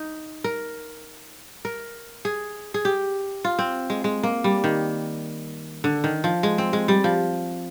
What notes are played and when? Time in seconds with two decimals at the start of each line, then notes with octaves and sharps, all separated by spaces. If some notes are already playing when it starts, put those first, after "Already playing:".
Already playing: D#4
0.44 A#4
1.65 A#4
2.25 G#4
2.74 G#4
2.85 G4
3.45 F4
3.59 C4
3.90 G#3
4.04 G#3
4.23 A#3
4.44 G3
4.64 D#3
5.84 D3
6.04 D#3
6.24 F3
6.43 G#3
6.58 C4
6.73 G#3
6.88 G3
7.04 F3